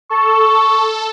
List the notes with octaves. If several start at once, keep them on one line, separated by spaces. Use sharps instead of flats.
A4 C#6